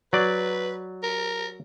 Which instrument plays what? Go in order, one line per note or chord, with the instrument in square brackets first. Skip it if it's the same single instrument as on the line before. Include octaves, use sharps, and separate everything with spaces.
[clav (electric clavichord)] F#3 D5 [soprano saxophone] B4
[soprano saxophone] A#4